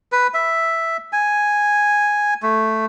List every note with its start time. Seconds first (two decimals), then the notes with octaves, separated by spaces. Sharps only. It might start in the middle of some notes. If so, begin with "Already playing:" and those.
0.12 B4
0.34 E5
1.13 G#5
2.43 A3